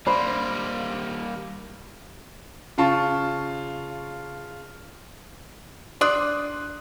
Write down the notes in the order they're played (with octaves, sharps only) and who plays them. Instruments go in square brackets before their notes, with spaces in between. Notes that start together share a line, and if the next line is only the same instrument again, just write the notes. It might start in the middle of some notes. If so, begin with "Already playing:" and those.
[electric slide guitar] G3 A#3 [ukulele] D4 C5 B5
[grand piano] C#3 F4 A5 C#6
[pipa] D4 D5 [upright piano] C6 D#6 F#6